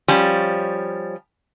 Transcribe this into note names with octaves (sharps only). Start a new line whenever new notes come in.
F3 G3 C#4